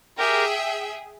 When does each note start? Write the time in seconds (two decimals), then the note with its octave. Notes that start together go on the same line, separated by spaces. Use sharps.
0.18 G4 G#4 A#4 E5 G5